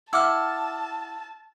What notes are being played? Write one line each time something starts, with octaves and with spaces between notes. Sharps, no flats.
E4 F#5 A5 D6 E6 F6